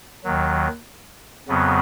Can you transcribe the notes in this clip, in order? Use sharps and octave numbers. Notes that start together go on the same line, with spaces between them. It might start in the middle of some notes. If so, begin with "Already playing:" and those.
D#2 D#3 F#3
F2 C#3 F#3 B3